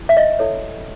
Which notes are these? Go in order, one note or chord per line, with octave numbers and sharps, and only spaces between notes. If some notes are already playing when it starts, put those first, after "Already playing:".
Already playing: E4
E5
D#5
E4 A4 C#5